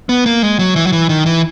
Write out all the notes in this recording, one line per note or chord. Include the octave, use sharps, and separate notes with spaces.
B3
A#3
G#3
F#3
E3
F#3
E3
D#3
E3